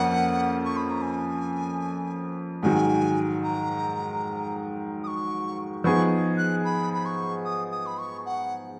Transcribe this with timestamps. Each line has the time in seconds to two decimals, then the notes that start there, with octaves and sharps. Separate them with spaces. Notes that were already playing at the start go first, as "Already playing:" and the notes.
Already playing: F2 F3 A#3 C#4 F#5
0.65 C#6
0.77 B5
0.90 A#5
1.02 G#5
2.62 G#2 D#3 F#3 G#5
3.43 A#5
5.04 D#6
5.07 C#6
5.84 F3 B3 D#4 G#4 C#6
6.37 F#6
6.65 B5
6.93 B5
7.06 C#6
7.45 D#6
7.72 D#6
7.86 B5
7.98 C#6
8.26 F#5